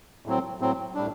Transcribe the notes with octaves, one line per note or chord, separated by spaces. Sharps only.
A2 F#3 C4
A2 F#3 C4
A2 G3 D4